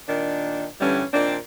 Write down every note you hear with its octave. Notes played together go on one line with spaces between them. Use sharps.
A#2 D#3 D4
G2 D3 E3 G3 C#4
A#2 D#3 C4 D4